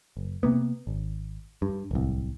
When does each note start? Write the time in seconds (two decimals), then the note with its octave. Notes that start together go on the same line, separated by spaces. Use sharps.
0.17 F#1
0.43 C3 A#3 B3
0.87 G#1
1.62 G2
1.91 D1 C2